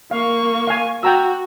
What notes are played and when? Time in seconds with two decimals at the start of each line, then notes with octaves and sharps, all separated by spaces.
0.11 A#3 F5 C#6
0.67 F5 G#5
1.03 F#4 G5 A#5 E6